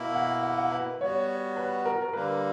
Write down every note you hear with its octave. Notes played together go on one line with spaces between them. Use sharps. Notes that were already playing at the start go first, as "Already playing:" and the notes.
Already playing: B2 A#3 E4
F#5
F#5
F#5
B4
G3 B3 F#4 C#5
B4
A#4
A#4
D3 G3 A#3 B4